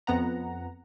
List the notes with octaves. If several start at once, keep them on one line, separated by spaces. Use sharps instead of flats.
F2 B3 F#5 A#5